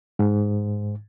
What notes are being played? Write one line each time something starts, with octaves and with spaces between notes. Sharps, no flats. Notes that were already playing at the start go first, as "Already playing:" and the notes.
G#2